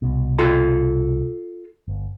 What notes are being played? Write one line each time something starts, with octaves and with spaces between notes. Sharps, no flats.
C2 B2
F4 A4 A#5
G1